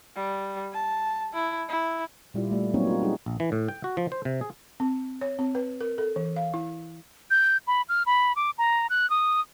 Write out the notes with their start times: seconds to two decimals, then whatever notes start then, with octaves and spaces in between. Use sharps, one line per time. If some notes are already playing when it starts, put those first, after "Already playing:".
0.15 G3
0.73 A5
1.34 E4
1.69 E4
2.34 A#2 G3 E4 F4 D5
2.51 G3 A3
2.74 F#3 A#3 C4 C#4 D#4 C#5
2.87 F4 F#4
3.02 F#3 G3 D#4 F4 G4 G#4
3.26 A#1
3.40 E3
3.52 A2
3.68 G5
3.84 F#4
3.97 F3
4.12 C5
4.25 C3
4.41 G#4
4.80 C4
5.21 C#5
5.39 C4
5.55 B4
5.81 A#4
5.98 A4
6.16 E3
6.36 F5
6.54 E4
7.31 G6
7.67 B5
7.89 F6
8.06 B5
8.36 D6
8.58 A#5
8.90 F#6
9.10 D#6